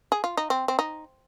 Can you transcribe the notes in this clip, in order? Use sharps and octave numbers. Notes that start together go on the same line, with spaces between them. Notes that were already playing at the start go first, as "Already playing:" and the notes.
G#4
F4
D#4
C4
C4
D#4